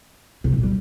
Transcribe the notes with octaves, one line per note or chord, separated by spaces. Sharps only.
C3
A#2
G3